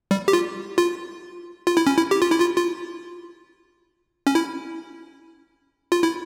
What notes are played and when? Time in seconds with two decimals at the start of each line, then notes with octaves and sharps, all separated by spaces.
0.11 G3
0.28 G4
0.33 F4
0.78 F4
1.67 F4
1.77 E4
1.87 C#4
1.97 E4
2.11 G4
2.22 F4
2.31 E4
2.40 F4
2.56 F4
4.27 C#4
4.35 E4
5.92 F4
6.03 E4